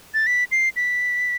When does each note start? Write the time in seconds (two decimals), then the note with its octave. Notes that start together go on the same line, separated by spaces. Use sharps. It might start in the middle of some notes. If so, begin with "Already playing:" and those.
0.14 A6
0.27 B6
0.52 C7
0.76 B6